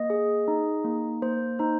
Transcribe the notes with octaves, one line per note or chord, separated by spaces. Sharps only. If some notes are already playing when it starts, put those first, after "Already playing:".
Already playing: A#3 D#5
G#4
D#4
A#3
A#3 C5
D#4 C5